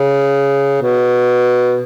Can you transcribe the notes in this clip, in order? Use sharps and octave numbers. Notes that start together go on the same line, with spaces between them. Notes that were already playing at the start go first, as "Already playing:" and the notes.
Already playing: C#3
B2